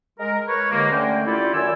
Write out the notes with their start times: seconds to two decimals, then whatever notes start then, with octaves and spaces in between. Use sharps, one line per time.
0.19 G#3 A#4
0.47 A#4 B4 C#5
0.72 D#2 D3 G#3 A#3
0.92 D3 A3 C#4 G5
1.26 D4 E4 F4 G4 A4 D5
1.54 F#2 D#3 D5 G#5 E6